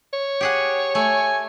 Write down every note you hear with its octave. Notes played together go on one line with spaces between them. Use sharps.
C#5
G4 G#4 F#5
A3 G#5